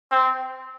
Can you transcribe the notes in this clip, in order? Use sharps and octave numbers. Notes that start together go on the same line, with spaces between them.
C4